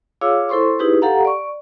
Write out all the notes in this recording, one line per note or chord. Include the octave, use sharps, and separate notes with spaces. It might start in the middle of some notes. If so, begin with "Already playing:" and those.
F4 G#4 C#5 F5 D6 E6
E4 A4 C5 C6 C#6
D#4 E4 G4 G#4 B4
G4 A4 F5 F#5 A#5
D5 C#6